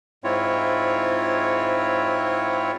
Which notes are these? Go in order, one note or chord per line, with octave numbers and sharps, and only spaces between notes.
G#2 C4 E4 F4 C#5